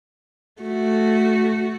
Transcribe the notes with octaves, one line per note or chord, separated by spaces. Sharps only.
A3 F#4